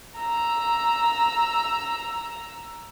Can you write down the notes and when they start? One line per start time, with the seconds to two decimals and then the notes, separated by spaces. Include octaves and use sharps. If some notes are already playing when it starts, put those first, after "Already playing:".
0.18 A#5 E6